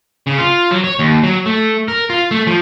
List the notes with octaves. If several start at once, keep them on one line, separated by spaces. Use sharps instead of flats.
C#3
F4
F#3
C#5
D#2
F#3
A3
A#4
F4
A3
F3